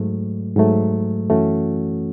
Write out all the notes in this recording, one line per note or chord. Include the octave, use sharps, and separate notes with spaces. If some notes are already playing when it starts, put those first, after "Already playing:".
Already playing: G#2 F#3 A3
G#2 F#3 A3
F#2 E3 A3 C#4 F#4